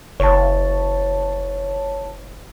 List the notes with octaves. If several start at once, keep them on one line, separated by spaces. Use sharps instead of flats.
F#1 C#5 A5